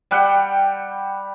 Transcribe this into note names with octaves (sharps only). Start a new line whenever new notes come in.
G3 F#5 G5